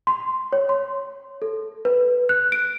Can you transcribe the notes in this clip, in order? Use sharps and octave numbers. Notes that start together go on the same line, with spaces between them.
C6
C#5
C6
A4
B4
F#6
D7